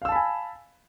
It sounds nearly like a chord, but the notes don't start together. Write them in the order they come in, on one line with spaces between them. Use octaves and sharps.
F5 E6 A5 B5 G#5